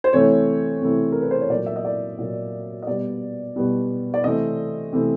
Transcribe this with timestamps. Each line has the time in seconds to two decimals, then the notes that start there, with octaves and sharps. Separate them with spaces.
0.04 C5
0.13 C3 E3 A3 C4 C#5
0.81 C3 E3 A3 C4
1.12 A#4
1.22 B4
1.31 C5
1.41 C#5
1.49 A#2 F#3 A#3 D5
1.66 E5
1.76 D#5
1.85 D5
2.18 A#2 F#3 A#3
2.82 D#5
2.87 B2 G3 B3 D5
3.56 B2 G3 B3
4.14 D5
4.24 C3 E3 A3 C4 D#5
4.93 C3 E3 A3 C4